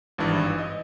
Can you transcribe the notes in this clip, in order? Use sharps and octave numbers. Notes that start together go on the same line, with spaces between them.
G#1 G2 E3
D#5